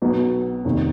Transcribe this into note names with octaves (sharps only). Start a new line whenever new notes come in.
B1 B2 F#3
F1 D#2 D#3